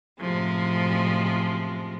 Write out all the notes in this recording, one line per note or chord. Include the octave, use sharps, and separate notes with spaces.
F#2 A2 C3 F3 G#3